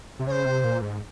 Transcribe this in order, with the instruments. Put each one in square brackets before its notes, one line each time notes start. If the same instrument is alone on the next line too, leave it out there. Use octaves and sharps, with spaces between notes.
[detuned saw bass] C3
[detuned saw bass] C#3 [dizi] C5 C#5
[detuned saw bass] C3
A#2
G#2